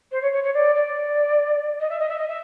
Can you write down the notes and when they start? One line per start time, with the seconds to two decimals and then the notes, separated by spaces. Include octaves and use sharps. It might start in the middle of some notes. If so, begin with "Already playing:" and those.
0.11 C5
0.22 C#5
0.32 C#5
0.43 C#5
0.53 D5
0.75 D5
1.80 D#5
1.89 E5
1.99 D#5
2.08 E5
2.18 D#5
2.28 E5